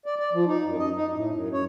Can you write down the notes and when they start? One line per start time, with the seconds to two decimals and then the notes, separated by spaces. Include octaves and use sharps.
0.06 D5
0.19 D5
0.33 F3
0.46 D#4
0.65 F#2
0.79 D#5
0.95 D#4
1.14 A2
1.31 F#2
1.53 C#5